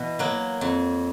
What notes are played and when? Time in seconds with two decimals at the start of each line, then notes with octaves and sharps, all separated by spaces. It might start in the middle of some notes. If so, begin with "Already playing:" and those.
Already playing: B2 E3
0.19 F#3 A#3
0.61 F2